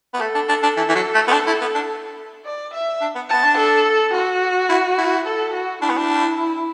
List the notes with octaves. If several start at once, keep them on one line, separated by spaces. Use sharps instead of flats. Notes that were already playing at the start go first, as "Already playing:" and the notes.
B3
A3 A4
D4
D4
D4
E3
E3
F#3
A3
B3
D4
E4
B3
D4
D5
E5
D4
B3
B3 A5
D4
A4
F#4
E4
E4
A4
F#4
D4 E4
B3
D4